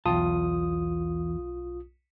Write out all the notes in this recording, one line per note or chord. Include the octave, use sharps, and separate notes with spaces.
B1 E2 F4 G5 A5 D#6